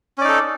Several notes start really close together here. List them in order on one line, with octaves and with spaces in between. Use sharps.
C#4 D5 D#4 A4